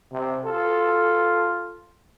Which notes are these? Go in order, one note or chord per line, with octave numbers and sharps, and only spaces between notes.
C3
F4 A4